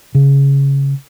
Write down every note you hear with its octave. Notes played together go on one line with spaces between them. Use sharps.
C#3